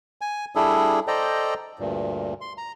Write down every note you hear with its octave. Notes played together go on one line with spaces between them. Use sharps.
G#5
G3 D4 E4 G#4 A4
A4 C5 D5 D#5 G5 A#5
D2 G2 A#2
C6
A#5